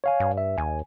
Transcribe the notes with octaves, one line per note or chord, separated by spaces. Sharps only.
C#5 F5 G#5
G2
E5
D#2 G#5